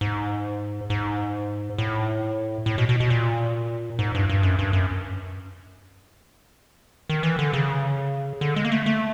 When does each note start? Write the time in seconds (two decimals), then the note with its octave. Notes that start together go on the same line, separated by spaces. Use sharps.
0.01 G#2
0.90 G#2
1.78 A2
2.66 A2
2.78 B2
2.89 B2
3.00 B2
3.10 A#2
3.99 G#2
4.15 G2
4.29 G2
4.43 F#2
4.59 G2
4.73 F#2
7.10 D#3
7.23 E3
7.39 D3
7.53 C#3
8.41 D3
8.56 G#3
8.65 A#3
8.72 A3
8.86 A3